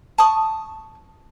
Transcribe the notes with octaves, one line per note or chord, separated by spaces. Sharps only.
A5 C#6 D#6